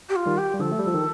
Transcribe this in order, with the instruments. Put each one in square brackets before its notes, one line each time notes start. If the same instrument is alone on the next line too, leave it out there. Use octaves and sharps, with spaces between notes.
[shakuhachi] G4
F4
[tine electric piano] D#3 G3
[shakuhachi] G4
[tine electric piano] G3
[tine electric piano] D3 F3 [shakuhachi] A4
[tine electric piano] A3
G3
F3
D#3